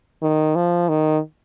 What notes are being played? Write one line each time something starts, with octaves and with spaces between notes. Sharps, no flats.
D#3
F3
D#3